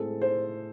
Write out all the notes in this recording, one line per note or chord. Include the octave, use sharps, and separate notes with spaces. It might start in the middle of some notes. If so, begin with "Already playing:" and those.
Already playing: A2 G#3 C4 A4
C5